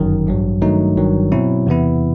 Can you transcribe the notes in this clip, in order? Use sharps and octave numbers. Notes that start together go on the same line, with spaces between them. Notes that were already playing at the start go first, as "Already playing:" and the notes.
Already playing: G1 F#2 D#3 F#3
A1 G2 F#3
G2 D#3 F#3 A3 D#4
G1 G2 D#3 F#3
B2 F#3 C4 E4
E2 C3 E3 B3 E4